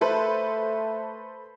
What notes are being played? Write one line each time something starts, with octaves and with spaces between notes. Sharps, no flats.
A3 A4 B4 C5